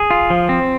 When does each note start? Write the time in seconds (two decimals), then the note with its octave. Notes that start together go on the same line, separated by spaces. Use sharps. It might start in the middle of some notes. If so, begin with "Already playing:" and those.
Already playing: G#4
0.10 F4
0.30 F3
0.49 C4